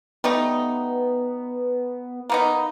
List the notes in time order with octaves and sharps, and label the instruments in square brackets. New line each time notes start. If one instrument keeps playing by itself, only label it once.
[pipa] G3 A3 D#4 [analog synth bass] B3
[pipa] A#3 B3 D#4